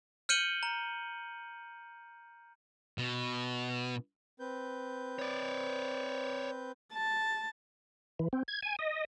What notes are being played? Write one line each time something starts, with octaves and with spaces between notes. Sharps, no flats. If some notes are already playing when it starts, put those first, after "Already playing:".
F6 G6 C#7 D#7 F#7 G7
A#5
B2
C4 B4 G6
C#5 D5
A5
E3
C4
G#6
G#5
D#5